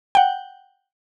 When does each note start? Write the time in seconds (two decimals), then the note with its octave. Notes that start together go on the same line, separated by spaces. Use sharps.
0.15 F#5 G5